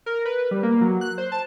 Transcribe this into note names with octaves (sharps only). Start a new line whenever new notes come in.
A#4
B4
G3
A#3
F#3
F#6
C5
A5